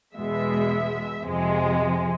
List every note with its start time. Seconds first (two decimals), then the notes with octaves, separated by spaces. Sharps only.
0.15 E2 B2 G#3 E5
1.22 F2 C3 F3 G#3